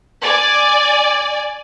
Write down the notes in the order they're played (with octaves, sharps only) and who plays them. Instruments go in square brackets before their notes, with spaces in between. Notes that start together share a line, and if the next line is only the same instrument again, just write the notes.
[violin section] D5 G#5